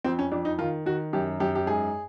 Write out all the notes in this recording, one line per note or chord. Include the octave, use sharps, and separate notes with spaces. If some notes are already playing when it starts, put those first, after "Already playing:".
F2 C4
C#4
F2 D4
D#4
D#3 F4
D#3 F#4
F#2 G4
F#2 G4
G4
G#2 G#4